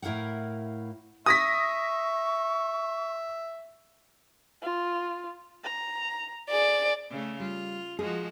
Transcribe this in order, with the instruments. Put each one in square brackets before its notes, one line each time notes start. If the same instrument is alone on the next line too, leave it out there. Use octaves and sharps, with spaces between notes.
[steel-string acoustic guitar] A2 E4 A#4 F5 F#5
[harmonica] E5 [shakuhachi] C#6 [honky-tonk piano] D#6 A#6 B6
[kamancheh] F4
A#5
[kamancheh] G#4 [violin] D5
[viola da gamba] C#3 A3
[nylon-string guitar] G3 [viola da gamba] F4
[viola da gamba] F3 G#3 F#4 [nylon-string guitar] G#4